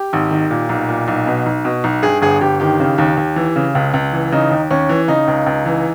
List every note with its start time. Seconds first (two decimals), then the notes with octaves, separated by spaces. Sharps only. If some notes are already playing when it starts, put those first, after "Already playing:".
Already playing: G4
0.13 G#1
0.31 D#3
0.51 A#2
0.69 B1
0.88 A#2
1.08 B1
1.27 B2
1.46 B1
1.65 B2
1.84 B1
2.03 G2 G#4
2.22 G1 G#4
2.41 G1 G4
2.60 D#3 G4
2.80 C#3
2.98 D#2
3.17 D#2
3.36 E3
3.56 C#3
3.75 C#2
3.94 C#2
4.13 E3
4.32 C#3 D#4
4.51 D#2
4.71 D#2 C#4
4.89 E3
5.08 C#3 D#4
5.27 C#2
5.46 C#2
5.66 E3